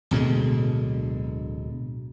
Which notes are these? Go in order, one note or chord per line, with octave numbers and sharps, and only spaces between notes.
D1 B2 D3 G#3